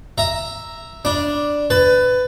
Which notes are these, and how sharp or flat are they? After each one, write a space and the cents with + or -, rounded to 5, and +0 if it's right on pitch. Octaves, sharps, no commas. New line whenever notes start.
E5 +0 A#5 +0
D4 +0 B5 -30
B4 +20 A5 +0